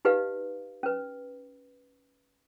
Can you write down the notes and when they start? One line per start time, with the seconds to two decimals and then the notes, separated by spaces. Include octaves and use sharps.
0.05 D#4 G4 B4 D#5 F5
0.83 C#4 B4